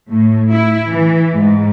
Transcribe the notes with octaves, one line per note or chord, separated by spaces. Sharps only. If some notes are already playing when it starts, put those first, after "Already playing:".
A2
E4
E3
G#2